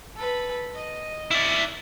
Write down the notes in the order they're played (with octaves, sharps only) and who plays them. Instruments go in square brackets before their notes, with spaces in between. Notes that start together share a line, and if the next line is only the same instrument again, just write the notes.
[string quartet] A4 B4
D#5
[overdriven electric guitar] E4 D5